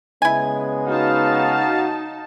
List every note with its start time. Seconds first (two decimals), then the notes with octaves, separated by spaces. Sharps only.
0.22 C#3 G#3 B3 E4 G#5
0.87 D#4 F#4 F5 A5